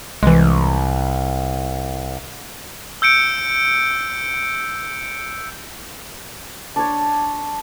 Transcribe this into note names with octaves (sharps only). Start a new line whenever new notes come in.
C2 E3 G#3
E6 G6 C#7 D7
D4 C#5